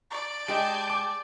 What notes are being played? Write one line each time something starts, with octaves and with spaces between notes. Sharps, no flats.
D5
G#3 G4 D#5 G#5 A5 G6 D7
D6 D7